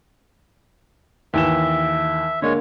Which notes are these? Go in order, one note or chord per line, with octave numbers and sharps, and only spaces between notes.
D#2 E3 E5 E7
D3 G#3 A#3 C#5